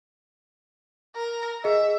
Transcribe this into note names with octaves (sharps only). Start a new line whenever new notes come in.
A#4
G#4 D#5 E5